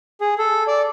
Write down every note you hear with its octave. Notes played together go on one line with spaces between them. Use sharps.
G#4
A4
D5